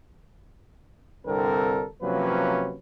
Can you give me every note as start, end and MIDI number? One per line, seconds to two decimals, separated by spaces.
1.27 1.86 36
1.27 1.86 43
1.27 1.86 50
1.27 1.86 60
1.27 1.86 69
1.27 1.86 70
2.03 2.77 48
2.03 2.77 53
2.03 2.77 54
2.03 2.77 58
2.03 2.77 61
2.03 2.77 71